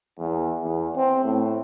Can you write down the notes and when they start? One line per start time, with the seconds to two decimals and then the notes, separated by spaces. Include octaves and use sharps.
0.19 E2
0.63 E2
0.96 C4
1.24 A2